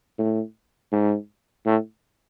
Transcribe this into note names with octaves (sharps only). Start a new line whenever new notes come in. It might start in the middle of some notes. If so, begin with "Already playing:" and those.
A2
G#2
A2